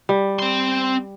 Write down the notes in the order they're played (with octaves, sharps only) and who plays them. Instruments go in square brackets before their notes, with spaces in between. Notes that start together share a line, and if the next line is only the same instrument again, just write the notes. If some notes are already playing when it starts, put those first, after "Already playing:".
[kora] G3
[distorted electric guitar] C4 C6